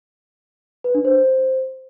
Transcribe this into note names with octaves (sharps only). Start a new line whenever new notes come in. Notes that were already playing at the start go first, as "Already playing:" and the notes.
B4
D4
C5